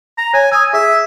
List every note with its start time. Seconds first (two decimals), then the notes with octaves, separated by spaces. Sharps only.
0.18 A#5
0.34 C#5 G#5
0.52 G#5 D#6 E6
0.73 G#4 E5